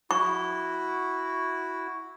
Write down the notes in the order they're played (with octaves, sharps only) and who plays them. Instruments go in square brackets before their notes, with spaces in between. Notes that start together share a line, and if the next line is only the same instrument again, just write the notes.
[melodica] E4 F#4 [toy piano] C#6